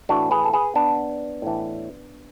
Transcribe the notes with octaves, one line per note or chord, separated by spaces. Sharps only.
A2 E3 D4 F#4
G#4 B4
A4
G#4 B4
B3 D4
A2 E3